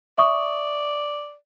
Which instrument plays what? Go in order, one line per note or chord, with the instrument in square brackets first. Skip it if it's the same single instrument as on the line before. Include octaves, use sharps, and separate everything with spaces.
[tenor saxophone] D5 [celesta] E5 C#6 D#6